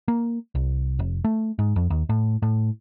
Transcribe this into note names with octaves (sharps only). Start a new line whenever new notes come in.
A#3
C2
F1
A3
G#2
F2
D#2
A2
A2